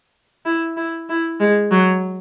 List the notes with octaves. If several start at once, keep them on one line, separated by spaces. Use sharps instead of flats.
E4
E4
E4
G#3
F#3